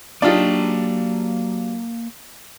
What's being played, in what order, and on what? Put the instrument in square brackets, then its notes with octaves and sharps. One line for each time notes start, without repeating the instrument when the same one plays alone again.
[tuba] F#3 [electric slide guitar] A#3 A5 [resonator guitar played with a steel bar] D4 G4 [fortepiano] D#4 F4 D5